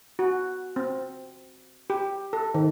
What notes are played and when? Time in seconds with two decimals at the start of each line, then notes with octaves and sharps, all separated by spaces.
0.19 F#4
0.76 C4
1.90 G4
2.33 A4
2.54 D#3